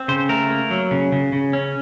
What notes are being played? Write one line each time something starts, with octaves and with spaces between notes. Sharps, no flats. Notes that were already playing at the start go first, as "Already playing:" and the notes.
Already playing: C4
C#3 C5
A3 A#4
A#3
F#3
C#3
C#3
C#3
C#4